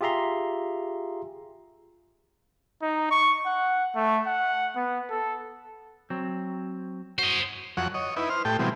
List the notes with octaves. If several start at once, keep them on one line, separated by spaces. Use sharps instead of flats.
F4 G4 G#4 E5 A#5 C6
D#4
C#6
F#5
A3
F#5
B3
A4
F#3 C4
F#4 C5 D#5
F2 F#3 F#5 C#6
C#5 D#5
D#4 E4 B4
C5 F6
A2 G4 A4 G5
B2 E3 F#3 G3 C4